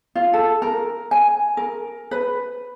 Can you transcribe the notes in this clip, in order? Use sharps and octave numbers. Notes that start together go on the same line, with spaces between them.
F4
A4
A#4
G#5
A#4
B4